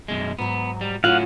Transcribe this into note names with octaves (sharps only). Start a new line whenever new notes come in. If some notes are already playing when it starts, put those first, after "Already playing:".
F#2 B2 G#3
G#2 F#3 B3
G3
A2 F#3 C#4 F4 F#4 F5 F#5